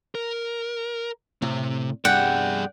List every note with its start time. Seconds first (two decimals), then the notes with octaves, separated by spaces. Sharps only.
0.15 A#4
1.42 A2 C3
2.05 G2 C3 G3 G#4 D5 F#5 G5